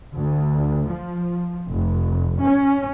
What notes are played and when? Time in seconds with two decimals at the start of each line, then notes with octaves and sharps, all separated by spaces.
0.15 D2
0.91 F3
1.70 F1
2.41 C#4